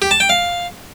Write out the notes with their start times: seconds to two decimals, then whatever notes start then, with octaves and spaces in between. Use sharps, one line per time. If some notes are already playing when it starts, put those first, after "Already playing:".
0.02 G4
0.11 A5
0.20 G5
0.30 F5